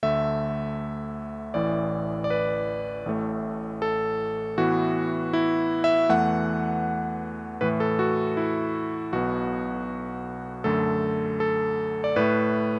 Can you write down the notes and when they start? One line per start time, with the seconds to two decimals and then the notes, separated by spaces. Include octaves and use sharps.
0.03 D2 D3 A3 E5
1.54 A1 A2 E3 D5
2.24 D5
2.30 B4
3.06 A1 A2 A3
3.82 A4
4.58 A2 E3 B3 F#4
5.33 E4
5.84 E5
6.09 E2 E3 A3 F#5
7.61 A2 E3 A3 B4
7.80 A4
7.99 F#4
8.37 E4
9.13 B1 B2 B3 F#4
10.64 F#2 D3 A3 A4
11.40 A4
12.04 D5
12.16 A2 A3 B4